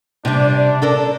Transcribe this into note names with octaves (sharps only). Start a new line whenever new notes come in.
C3 G3 D4
D4 A4 A#4